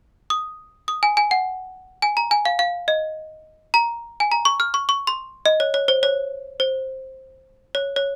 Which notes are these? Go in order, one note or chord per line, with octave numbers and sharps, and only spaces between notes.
D#6
D#6
G#5
G#5
F#5
G#5
A#5
G#5
F5
F5
D#5
A#5
G#5
A#5
C#6
F6
C#6
C#6
C6
D#5
C#5
C#5
C5
C#5
C5
C#5
C#5